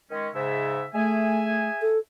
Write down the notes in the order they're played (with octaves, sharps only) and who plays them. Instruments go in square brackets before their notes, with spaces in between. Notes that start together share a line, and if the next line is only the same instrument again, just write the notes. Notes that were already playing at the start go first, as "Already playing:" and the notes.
[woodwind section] D#3 G#3 C#4
G#2 C#3 E5
[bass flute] A3 [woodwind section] G#4 E5 G#5
[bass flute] A4